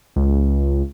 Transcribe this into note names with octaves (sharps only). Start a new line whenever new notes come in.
C#2